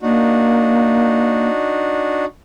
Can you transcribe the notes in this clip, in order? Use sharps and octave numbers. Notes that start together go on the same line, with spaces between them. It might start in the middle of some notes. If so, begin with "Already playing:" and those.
A#3 D4 D#4 F#4